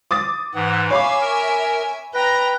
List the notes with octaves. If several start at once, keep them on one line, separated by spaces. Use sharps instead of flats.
D6 D#6 A6
G#2 E3 F#5
C#5 E5 F5 G#5 B5 D6
A#4
B4 G5 A#5 A#6